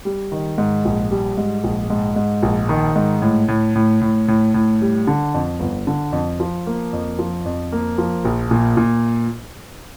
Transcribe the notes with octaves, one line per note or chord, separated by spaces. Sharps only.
G3
D#3
G#2
A#1
G3
G#2
A#1
G#2
G#2
A#1
D#3
G#2
A2
A2
A2
A2
A2
A2
G3
D3
F2
G1
D3
F2
F3
A#3
F2
F3
F2
A#3
F3
A#1
A#2
A#2